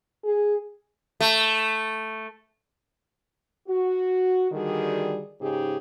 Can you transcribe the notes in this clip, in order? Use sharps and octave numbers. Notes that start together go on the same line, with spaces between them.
G#4
A3
F#4
D3 D#3 G3 F#4 G#4
G#2 C#3 D#4 G4 G#4